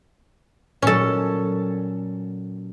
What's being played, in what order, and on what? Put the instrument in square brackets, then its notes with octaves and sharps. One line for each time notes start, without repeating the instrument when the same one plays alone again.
[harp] A#2 F#3 [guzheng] C#4 A4